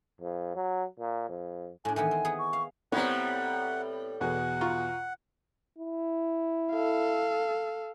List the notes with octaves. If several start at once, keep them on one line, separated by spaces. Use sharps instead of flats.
F2
F#3
A#2
F2
A2 D4 G#5
D#3 E3 B3 G#5
C4
B3 G#4
C#6
F5
A2 G3 B3 C4 C#5 F#5 A#5
E2 B2 G#4 F#5
F4 A#5 C#6
E4
A4 F5